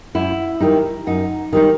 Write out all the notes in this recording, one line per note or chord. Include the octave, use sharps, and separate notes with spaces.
F#2 E4
D#3 G3 D#4
F#2 D#4
D#3 G3 D#4